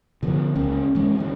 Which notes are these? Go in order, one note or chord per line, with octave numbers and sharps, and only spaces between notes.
D3 F3 B3
C#2 A#3 C#4
E3 G#3 C#4
D#3 G3 C#4